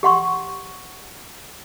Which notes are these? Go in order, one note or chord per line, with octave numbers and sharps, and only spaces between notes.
G4 F#5 C6 C#6